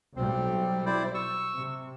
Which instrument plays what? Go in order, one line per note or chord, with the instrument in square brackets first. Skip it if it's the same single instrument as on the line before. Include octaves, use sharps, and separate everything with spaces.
[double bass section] B1 G3 [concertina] C4
[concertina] E4 C5 D5
C#6 E6
[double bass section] C3